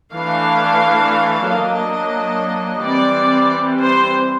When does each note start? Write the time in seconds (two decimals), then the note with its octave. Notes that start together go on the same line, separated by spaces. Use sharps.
0.13 E3 A3 D4 F5
1.47 F#3 A#3 D4 D#5
2.81 E3 G3 C4 D5
3.82 C5